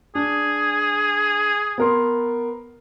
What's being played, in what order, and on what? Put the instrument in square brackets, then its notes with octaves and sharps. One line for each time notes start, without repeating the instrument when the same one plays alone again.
[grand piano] D4 [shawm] G#4
[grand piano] B3 A#4 C6